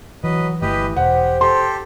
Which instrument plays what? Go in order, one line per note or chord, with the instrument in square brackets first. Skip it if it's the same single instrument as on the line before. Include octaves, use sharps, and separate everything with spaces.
[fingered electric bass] E3 [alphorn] F#3 [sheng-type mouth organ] B4 D#5
[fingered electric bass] G1 A3 [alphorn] E3 [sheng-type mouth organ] G4 B4 D#5
[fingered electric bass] E1 [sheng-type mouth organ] G4 [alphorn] C5 [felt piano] F#5
[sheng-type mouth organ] G4 A4 [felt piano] C6